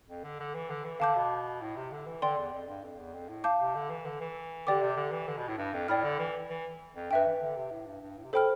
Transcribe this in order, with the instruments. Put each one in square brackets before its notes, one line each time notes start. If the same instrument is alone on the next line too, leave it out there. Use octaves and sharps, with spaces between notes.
[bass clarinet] F2
D3
D3
E3
D3
E3
[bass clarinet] D3 [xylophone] F5 A5 D6 G6
[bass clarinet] B2
A2
C3
D3
E3
[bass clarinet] D3 [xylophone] D5 G5 C6
[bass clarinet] E2
F2
G2
F2
E2
F2
A2
[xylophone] F5 A5 D6 G6
[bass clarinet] C3
D3
E3
D3
E3
[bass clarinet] D3 [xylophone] G4 D5 G5 D6
[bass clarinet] C3
D3
E3
D3
B2
A2
G2
F2
[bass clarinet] A2 [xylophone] D5 G5 B5 F6
[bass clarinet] D3
E3
E3
F2
[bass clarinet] G2 [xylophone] B4 E5 G5
[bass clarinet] E3
D3
C3
A2
G2
G2
A2
C3
[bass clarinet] B2 [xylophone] A4 C5 G5 B5 F6